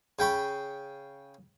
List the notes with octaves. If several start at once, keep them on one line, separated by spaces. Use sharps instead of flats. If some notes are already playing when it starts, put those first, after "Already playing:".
C#3 G5 B5 C#6